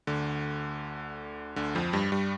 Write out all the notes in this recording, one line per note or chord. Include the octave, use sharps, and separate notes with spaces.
D2 D3
D2 D3
F2 F3
G2 G3
G2 G3